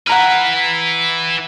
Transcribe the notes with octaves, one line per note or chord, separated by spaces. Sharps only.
E4 B4 F#5 A#5 F6